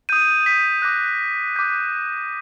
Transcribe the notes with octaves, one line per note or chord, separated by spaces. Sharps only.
D#6 G6 D#7
B6
D6 F#6 A#6
D6 G6 B6